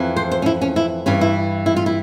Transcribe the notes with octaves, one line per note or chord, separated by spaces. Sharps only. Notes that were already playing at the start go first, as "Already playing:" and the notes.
Already playing: F2 E3
C5
C5
C#4
E4
C#4
E4
G2 E3 C#4
E4
E4
F4
E4